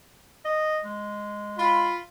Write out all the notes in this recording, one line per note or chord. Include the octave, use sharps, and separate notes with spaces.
D#5
G#3
F4 B5